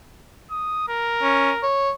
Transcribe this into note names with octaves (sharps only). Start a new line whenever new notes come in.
D#6
A#4
C#4
C#5